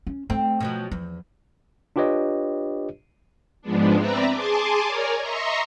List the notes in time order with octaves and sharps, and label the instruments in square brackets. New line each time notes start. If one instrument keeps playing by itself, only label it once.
[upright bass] C#4
[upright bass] A3 [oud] C4
[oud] B2 F3 F#3
[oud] E2 [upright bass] F3
[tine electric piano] D4 F4 G4 B4 C#5 D#5
[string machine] G#2 F3 G#3 B3 D4
C4 B4 D5 E5 A#5
G#4 G#5 A5 C6 D6
A#4 C#5 D5 G#5 A#5
D#5 E5 A#5 C6 C#6